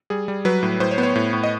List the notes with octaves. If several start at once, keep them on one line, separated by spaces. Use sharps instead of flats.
G3 G#4
G3
F#3 B4
A2
A2 C5
C#5
B3
C#5
A2
A2
D#5